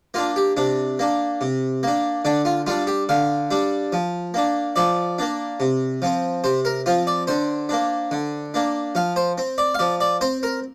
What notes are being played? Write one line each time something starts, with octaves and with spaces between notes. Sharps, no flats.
A#3 D4 F4
G4
C3 D4
A#3 D4
C3
A#3 D4
D3 D4
F4
G3 D4 F4
G4
D3 F5
G3 D4
F3
A#3 D4
F3 D5
A#3 D4
C3
F3 C4
C3 C5
A#4
F3 C4 F4
D5
D3 C5
A#3 D4
D3
A#3 D4
F3 F5
C5
C4
D5
F5
F3 D5
D5
C4 C5
A#4